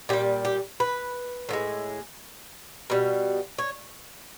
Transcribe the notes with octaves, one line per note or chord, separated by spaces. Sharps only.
A#2 G3 G4
G4
B4
A2 F3 G#3
B2 G3
C#5